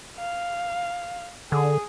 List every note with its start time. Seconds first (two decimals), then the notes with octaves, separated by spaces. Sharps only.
0.18 F5
1.52 D3 G#4